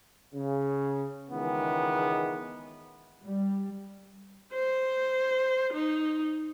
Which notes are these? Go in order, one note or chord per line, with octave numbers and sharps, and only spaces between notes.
C#3
C#2 D#3 E3 G#3 B3
G3
C5
D#4